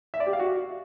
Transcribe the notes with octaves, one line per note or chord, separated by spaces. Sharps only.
E5
D5
G4
F5
F#4